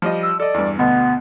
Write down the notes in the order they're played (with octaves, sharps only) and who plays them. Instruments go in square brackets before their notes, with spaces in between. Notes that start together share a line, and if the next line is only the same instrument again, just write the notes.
[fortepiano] F3 G3 D#5
[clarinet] E6
[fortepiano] A4 D#5 [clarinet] D5
[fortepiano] E2 G2
[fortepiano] D2 B2 [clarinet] B3